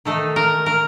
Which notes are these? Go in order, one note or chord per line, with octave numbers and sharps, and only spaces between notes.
D#3 A3 D#4 A4
A#4
A#4